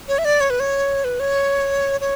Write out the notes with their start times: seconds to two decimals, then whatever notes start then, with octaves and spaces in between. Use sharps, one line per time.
0.08 C#5
0.18 E5
0.25 D5
0.41 C#5
0.50 B4
0.60 C#5
1.04 B4
1.20 C#5
2.01 C#5